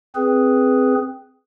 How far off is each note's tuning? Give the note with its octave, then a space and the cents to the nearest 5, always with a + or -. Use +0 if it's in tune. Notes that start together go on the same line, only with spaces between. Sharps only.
C4 -5 G#4 +0 B4 +0